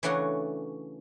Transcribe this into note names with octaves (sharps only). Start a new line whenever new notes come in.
C#3 E3 A3 D4 F#4 C#5